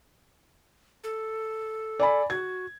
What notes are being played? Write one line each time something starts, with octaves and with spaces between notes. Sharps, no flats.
A4
D5 G#5 B5
F#4 G#6